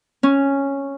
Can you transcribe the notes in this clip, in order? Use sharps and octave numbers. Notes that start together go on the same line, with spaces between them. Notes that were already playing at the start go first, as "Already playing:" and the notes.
C#4